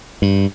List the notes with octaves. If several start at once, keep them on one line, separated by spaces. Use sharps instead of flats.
G2